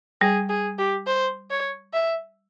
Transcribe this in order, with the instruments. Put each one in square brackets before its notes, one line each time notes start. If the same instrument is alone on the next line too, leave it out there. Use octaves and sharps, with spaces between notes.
[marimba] G3 [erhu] G#4
[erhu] G#4
G4
C5
C#5
E5